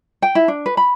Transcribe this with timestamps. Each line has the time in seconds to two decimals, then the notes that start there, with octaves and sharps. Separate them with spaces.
0.22 G5
0.35 E4
0.48 D4
0.66 B4
0.77 B5